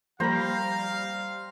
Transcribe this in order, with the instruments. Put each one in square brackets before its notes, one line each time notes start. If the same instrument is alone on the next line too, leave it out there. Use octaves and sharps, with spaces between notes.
[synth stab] F3 A#3 B5 [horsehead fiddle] G3 [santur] C5 A#5 [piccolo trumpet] F5